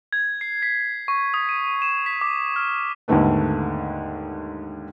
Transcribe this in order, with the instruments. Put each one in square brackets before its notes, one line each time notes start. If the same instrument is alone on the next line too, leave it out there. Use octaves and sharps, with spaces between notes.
[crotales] G#6
C7
B6
C#6
D#6
D#7
E7
B6
D6
F6
[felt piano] D#2 G#2 D3 D#3 A3 B3